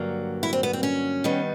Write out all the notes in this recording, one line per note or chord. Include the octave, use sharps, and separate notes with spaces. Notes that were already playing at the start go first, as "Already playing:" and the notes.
Already playing: G2 D3 F#3 A#3
E4
C4
B3
C4
C#4
G2 D#3 G3 B3